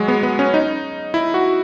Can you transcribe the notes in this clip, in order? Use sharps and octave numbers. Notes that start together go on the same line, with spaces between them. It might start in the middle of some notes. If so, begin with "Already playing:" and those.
Already playing: F#3 G#3
B3
B3
C#4
D#4
E4
F#4